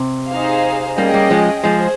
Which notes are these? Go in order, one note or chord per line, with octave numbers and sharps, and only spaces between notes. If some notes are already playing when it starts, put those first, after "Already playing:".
Already playing: C3
D#4 G#4 C5 F5
G3 A#3 C#4 G#4 D#5 G5
G3 A#3
F3 G#3
F3 G#3 G#4 C5